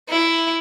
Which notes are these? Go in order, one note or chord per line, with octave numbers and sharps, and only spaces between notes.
E4